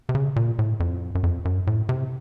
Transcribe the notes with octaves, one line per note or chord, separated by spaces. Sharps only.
C3
C#3
A#2
A2
F2
F#2
F2
F#2
A2
C3